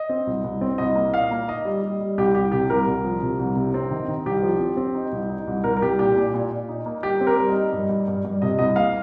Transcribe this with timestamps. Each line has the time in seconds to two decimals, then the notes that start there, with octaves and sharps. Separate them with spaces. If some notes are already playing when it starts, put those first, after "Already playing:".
Already playing: D#5
0.09 C4
0.27 C2
0.44 C2
0.61 C4
0.78 C2 D#5
0.96 A#3
1.14 A#2 F5
1.31 A#3
1.48 D#4 D#5
1.65 G3
1.83 G3
2.00 G3
2.18 C2 G4
2.35 C2 G4
2.52 C3 G4
2.70 C2 A#4
2.87 C2
3.04 F3
3.22 C3
3.39 C2
3.56 C3
3.74 C4
3.91 D#3
4.08 D#3
4.26 C2 G4
4.42 F3
4.60 C4
4.77 C4
4.95 D#4
5.12 C2
5.29 D#4
5.47 C2
5.64 C2 A#4
5.77 A#4
5.82 C2 G4
5.99 A#2 G4
6.17 A#2
6.34 A#2
6.51 A#2
6.69 D#4
6.86 A#3
7.03 G3 G4
7.21 C4
7.27 A#4
7.37 G3
7.49 D#5
7.55 D#4
7.73 G2
7.89 G2
8.08 G2
8.25 G2
8.42 C3 D#5
8.59 C2 D#5
8.76 A#3 F5